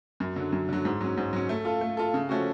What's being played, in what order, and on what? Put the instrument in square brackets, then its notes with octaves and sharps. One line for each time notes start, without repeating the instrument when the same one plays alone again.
[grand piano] F#2
D3 F#3
F#2
D3 F#3
G#2
F#3 C#4
G#2
F#3 C#4
A3
F4 A4
A3
F4 A4
C#3
F3 A3 C#4 F#4